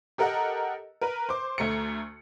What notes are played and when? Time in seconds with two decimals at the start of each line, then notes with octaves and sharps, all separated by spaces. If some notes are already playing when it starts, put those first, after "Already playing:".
0.18 G4 A4 A#4 D#5 F#5
1.01 A#4 B4
1.29 C5 D6
1.58 D2 A3 A#5 C#7